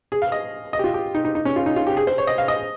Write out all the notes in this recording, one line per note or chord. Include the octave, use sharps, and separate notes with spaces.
G#4
F5
D#5
D#5
G4
F4
G4
D#4
D#4
D#4
C#4
F4
D#4
F4
G4
G#4
C5
C#5
D#5
F5
D#5